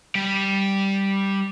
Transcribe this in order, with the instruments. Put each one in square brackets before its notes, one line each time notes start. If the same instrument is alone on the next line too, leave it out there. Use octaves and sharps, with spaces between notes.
[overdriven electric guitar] G3